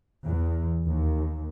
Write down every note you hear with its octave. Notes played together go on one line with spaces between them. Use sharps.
E2
D#2